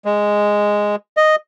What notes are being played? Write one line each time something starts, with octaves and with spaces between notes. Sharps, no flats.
G#3
D#5